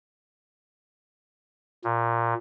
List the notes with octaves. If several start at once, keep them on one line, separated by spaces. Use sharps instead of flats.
A#2